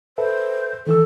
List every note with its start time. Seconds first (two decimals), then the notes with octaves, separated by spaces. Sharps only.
0.18 A4 B4 C5 E5
0.87 D#3 E3 A4 E6